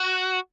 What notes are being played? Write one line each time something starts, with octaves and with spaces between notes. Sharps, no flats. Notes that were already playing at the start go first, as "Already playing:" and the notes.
Already playing: F#4